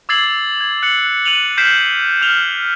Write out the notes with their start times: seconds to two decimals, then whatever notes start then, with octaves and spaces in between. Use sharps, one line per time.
0.09 D6 E6 G#6 A6 C7 F#7
0.61 G#6
0.83 F#6 C#7 F#7
1.25 F#6 D#7 F7 F#7
1.58 F6 G6 B6 C7 D7 E7
2.22 F6 F7 G7